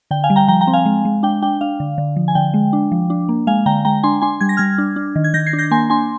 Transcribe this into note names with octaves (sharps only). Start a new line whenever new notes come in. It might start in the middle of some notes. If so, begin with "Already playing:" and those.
D3 G5
F5 G#5
G3
G5 A#5
F3 G5 A#5
G5 A#5
C4
F5 G#5
G#3
G#3
D4 G5
D4 G5
D4 F5
D3
D3
F3
G#5
D3 G5
G#3
D4
F3
D4
A#3
G#3 F5 G#5
D3 G5 A#5
G#3 G5 A#5
D4 G#5 C6
D4 G#5 C6
G3 G#6
A#6
G3 F6 G#6
D4
D4
D#3
G#6
D#3 G6 A#6
G#6 C7
D4
G6 A#6
A#3 G#5 C6
D4 G#5 C6